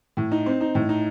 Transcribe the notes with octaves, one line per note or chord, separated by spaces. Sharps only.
A2
D#4
C4
D#4
A2
D#4